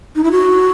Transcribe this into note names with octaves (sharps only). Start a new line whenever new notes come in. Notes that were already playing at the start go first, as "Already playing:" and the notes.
D#4
E4
F#4